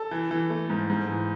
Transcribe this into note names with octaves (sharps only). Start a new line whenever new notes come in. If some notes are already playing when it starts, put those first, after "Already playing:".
Already playing: A4
E3
E3
A3
G#2
G#2
E3